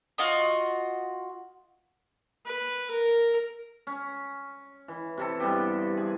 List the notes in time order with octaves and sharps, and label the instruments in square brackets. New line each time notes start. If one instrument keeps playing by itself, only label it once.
[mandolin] F4 F#4 D#5
[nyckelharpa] B4
A#4
[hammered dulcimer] C#4
E3
C3 E3 A4
G2 C3 B3 G4
G#4